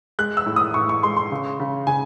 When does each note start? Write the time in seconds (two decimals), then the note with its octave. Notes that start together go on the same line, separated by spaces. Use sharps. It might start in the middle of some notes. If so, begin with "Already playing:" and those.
0.19 G#3 F#6
0.37 E6
0.46 A2
0.56 D#6
0.74 A2 C#6
0.89 C#6
1.03 G#3 C6
1.17 C6
1.31 C#3
1.60 C#3
1.87 C#3 G#5